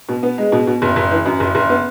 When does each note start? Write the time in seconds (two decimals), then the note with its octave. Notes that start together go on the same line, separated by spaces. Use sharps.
0.09 B2
0.23 B3
0.38 G#3
0.52 B2
0.67 B2
0.82 F#1
0.96 F#1
1.11 E3
1.26 F#2
1.40 F#1
1.55 F#1
1.69 B3